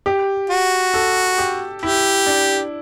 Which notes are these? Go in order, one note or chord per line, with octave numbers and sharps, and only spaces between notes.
G4
F#4
A4
G4
E4 G4
D4